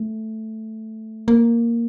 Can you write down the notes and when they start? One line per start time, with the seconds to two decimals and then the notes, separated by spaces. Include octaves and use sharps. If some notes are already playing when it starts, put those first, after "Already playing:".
Already playing: A3
1.28 A#3